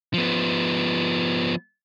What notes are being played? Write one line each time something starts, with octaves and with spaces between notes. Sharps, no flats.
F3 B3